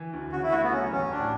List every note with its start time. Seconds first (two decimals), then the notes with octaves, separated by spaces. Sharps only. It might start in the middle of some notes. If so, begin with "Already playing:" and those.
Already playing: E3
0.13 D2
0.32 C#3 F#4
0.43 E4
0.52 A3 F#4
0.63 B3
0.71 F#3 C#4
0.92 A1 C#4
1.11 A2 D4